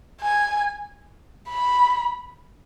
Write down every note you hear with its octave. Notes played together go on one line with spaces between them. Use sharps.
G#5
B5